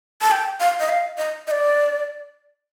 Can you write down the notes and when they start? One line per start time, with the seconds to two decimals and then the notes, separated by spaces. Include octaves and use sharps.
0.21 A5
0.32 G5
0.60 F5
0.80 D#5
0.89 F5
1.18 D#5
1.47 D#5
1.51 D5